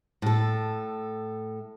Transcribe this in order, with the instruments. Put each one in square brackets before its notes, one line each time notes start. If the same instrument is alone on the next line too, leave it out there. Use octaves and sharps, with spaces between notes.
[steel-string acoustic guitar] A2 A4